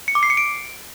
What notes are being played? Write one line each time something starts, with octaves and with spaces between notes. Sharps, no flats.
C#7
D6
C7
C#7
D7